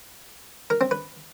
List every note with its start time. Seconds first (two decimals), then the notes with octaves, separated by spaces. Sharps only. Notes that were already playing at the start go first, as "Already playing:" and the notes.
0.70 A#4
0.81 C4
0.91 B4